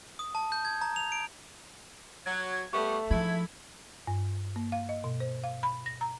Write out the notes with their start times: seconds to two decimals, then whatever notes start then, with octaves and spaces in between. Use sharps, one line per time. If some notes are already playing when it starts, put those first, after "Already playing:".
0.19 D#6
0.35 A5
0.52 G6
0.65 G#6
0.81 A#5
0.96 F7
1.12 D7
2.26 F#3 G#6
2.73 G3 A3 B3 C#6
3.11 G#2 F3 E4 B5 G#6
4.07 G2
4.56 A#3
4.72 F5
4.89 D#5
5.04 B2
5.20 C5
5.44 F5
5.63 B5
5.86 A#6
6.01 A#5